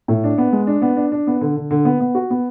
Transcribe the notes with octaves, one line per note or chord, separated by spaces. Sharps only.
A2
D4
B3
G#3
D4
B3
D4
D4
B3
D3
D3
D3
B3
B3
F#4
B3